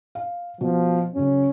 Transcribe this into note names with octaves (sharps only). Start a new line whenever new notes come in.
F5
B2 F3
F#2 C#3 C#4